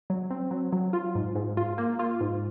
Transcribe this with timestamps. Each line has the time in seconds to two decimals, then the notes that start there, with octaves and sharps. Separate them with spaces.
0.10 F#3
0.31 C4
0.51 F#3
0.72 F#3
0.93 F4
1.15 G#2
1.36 G#2
1.57 F4
1.78 A#3
1.99 F4
2.21 G#2